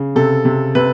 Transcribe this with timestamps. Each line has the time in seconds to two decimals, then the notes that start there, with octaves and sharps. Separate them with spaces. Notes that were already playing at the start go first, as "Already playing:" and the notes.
Already playing: C#3
0.16 C3 A4
0.45 C3
0.75 C3 B4